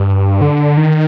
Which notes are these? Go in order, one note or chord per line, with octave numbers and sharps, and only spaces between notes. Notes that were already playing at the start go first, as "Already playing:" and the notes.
Already playing: G2
D3
D#3